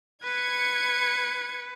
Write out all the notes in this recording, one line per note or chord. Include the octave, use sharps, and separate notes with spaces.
B4 G#6 C#7